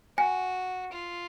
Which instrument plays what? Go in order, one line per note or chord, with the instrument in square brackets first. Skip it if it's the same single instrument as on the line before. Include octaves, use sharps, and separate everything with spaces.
[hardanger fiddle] F#4 [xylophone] G#5
[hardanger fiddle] F4